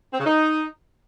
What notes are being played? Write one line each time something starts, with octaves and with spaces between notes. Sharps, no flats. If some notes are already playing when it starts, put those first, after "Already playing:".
C4
C#3
D#4